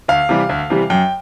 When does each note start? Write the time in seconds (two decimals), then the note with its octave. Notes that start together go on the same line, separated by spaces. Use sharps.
0.08 D2 F5
0.29 C3 E3 G3
0.49 D2
0.70 C3 E3 G3
0.90 F#2 G5